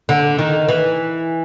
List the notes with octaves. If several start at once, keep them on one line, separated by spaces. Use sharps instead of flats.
D3
D#3
E3